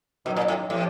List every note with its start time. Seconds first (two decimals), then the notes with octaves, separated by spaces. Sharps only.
0.26 F#2 B2 D#3 F#3
0.36 A#2
0.48 A2
0.70 A2 C3 F3